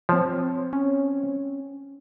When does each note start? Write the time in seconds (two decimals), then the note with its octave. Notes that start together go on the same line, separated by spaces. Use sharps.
0.09 F3 C4 C#5
0.73 C#4